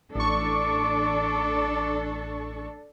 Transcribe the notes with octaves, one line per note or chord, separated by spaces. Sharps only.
A1 D4 A4 C#6 D6